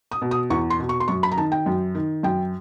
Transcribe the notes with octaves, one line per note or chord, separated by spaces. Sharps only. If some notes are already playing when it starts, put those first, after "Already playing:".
D#6
B2
D#6
E2 C#6
C6
B2
C#6
C6
F#2 C#6
B5
A#5
D#3 A5
G5
F#2
D#3
F#2 G5